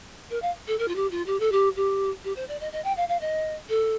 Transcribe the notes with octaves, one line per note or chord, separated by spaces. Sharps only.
A#4
F5
A4
A#4
F4
G4
F4
G4
A4
G4
G4
G4
C5
D5
D#5
D#5
G5
F5
F5
D#5
A4